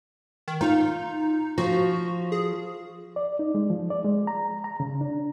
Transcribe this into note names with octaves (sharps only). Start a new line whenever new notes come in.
D#3
D#4 F4
F3 F#4
G#4
D5
D#4
G#3
F3
D5
G#3
A#5
A#5
C#3
D4